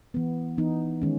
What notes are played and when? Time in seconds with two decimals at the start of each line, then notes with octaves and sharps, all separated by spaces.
0.14 E3 B3
0.58 E3 B3 D#4
1.02 D#3 G#3 C#4